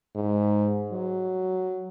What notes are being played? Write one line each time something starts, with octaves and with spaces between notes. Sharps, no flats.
G#2
F#3